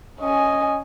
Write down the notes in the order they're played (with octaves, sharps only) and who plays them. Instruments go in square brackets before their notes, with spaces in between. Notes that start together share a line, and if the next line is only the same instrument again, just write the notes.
[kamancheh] C#4 G#5 [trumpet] D#5